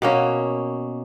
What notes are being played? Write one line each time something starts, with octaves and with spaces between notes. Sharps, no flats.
B2 A#3 C#4